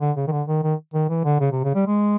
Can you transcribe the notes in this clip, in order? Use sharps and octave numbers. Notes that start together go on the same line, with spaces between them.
D3
C#3
D#3
D3
D#3
D#3
D#3
E3
D3
C#3
C3
C#3
G3
G#3